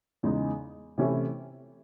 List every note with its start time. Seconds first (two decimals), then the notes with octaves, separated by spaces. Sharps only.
0.23 E2 C#3 G#3 D#4
0.98 C3 E3 A3 C#4 E4